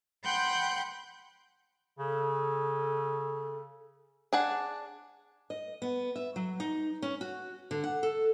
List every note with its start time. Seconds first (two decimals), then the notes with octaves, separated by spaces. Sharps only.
0.24 F#5 G5 B5 C6 F#6 G6
1.99 C#3 A4
4.33 D4 G#4 F#5
5.50 D#5
5.82 B3
6.16 E5
6.36 F#3
6.60 D#4
7.02 C#4
7.21 F#4
7.71 D3
7.84 F#5
8.03 A4